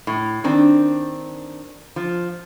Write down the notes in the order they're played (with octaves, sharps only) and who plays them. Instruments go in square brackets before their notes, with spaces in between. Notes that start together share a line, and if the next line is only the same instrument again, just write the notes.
[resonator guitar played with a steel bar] A2
D#3 C4 D4
F3